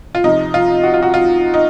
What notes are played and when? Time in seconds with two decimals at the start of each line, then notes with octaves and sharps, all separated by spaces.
0.15 F4
0.24 C3 F3 D#4
0.54 F4
0.83 F#4
0.94 F4
1.03 F#4
1.14 F4
1.54 D#4